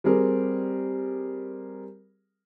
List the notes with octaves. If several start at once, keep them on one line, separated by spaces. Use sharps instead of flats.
G3 C4 G#4 A#4